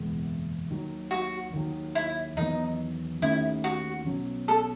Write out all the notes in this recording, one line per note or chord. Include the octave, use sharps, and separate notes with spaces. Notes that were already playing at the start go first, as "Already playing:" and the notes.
Already playing: F#1 E2 B2 G#3
D#2 D#3 F#3
F#4
D#2 D#3 F#3
E4
E2 D#3 F#3 B3 D#4
D#2 D#3 A3 C#4 E4
F#4
B1 B2 F#3 C#4
A4